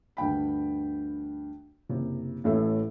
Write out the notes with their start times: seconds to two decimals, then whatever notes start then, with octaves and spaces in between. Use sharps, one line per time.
0.17 D2 G2 G5 B5
1.89 F#1 C3
2.44 A1 A2 A4 E5